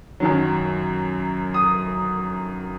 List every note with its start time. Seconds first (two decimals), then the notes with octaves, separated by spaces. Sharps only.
0.20 F#2 D#3 F#3
1.54 D#6